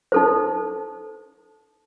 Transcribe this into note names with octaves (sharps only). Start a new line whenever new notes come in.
D#4 A4 C5